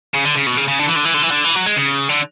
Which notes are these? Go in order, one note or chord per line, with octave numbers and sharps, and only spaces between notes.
C#3
D3
C#3
B2
C#3
C#3
D3
E3
D3
E3
D3
E3
D3
E3
F#3
G#3
C#3
D3